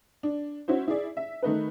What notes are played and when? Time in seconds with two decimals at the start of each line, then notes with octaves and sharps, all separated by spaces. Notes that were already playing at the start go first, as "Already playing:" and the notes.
0.23 D4
0.68 C#4 E4 F#4 C5
0.88 E4 G#4 D5
1.17 E5
1.43 D#3 A3 D#4 B4